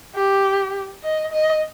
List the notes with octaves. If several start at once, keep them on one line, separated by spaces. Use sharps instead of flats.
G4
D#5
D#5